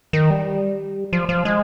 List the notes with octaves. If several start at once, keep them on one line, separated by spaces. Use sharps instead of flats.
D#3
G3
F3
F3
G#3